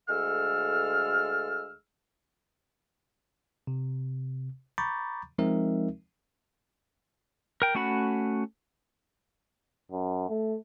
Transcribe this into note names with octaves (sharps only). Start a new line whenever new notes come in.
D2 G#3 A4 F5 E6 F6
C3
A#5 B5 C#6 D6 G6 A6
F3 G#3 C4 D#4 A#4 E5
A#4 G5
A3 C#4 F#4 F#5 B5
F#2
A3